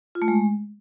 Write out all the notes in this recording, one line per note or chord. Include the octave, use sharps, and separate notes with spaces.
F4
A3
G#3